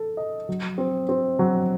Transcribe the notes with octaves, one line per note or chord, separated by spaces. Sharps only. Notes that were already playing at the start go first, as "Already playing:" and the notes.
Already playing: A4
D#5
F#3
C4
C4
F#3